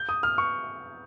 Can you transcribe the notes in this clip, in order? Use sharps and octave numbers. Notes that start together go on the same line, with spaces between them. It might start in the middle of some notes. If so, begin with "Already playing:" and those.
Already playing: G6
D#6
F6
C#6